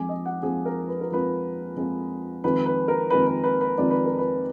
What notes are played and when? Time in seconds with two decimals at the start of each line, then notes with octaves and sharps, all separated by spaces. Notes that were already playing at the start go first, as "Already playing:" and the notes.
Already playing: F2 F3 G#3 G#5 D6
0.09 D#5
0.26 F#5
0.42 F2 F3 G#3 G#4
0.66 A#4
0.88 B4
1.01 A#4
1.10 F2 F3 G#3 B4
1.77 F2 F3 G#3
2.44 F2 D#3 G#3 B4
2.66 B4
2.88 A#4
3.10 F2 D#3 G#3 B4
3.27 B4
3.44 B4
3.61 B4
3.78 F2 D#3 G#3 D5
3.91 B4
4.05 A#4
4.19 B4